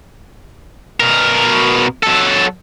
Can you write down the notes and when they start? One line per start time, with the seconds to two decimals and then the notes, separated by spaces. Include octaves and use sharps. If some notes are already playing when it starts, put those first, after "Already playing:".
1.00 B2 A#4
2.03 F#3 A4